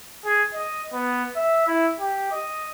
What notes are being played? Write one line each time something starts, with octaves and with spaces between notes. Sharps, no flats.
G#4
D#5
B3
E5
E4
G4
D#5